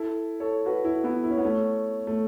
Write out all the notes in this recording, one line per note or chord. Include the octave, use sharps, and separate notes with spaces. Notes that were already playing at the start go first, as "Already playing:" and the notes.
Already playing: E4 A4
A4 C#5
F#4 B4
E4 A4
B3 E4
E4
C#4
B3
A3 C#4
A3